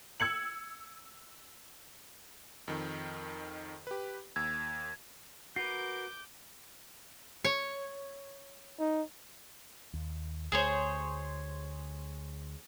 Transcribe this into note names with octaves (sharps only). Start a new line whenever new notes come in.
E6 G#6 C#7 F#7
F2 D#3
G4 B4
D#2 E6 G#6
F#4 A#4 B4 D6 G6 C7
C#5
D#4
D#2
D2 A3 G#4 C5 C#5